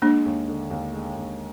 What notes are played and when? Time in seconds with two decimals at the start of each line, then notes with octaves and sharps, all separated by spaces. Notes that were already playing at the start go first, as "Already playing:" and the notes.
0.02 G#3 A#3 D4
0.25 D#2
0.48 D3
0.70 D#2
0.93 G#3
1.16 D#2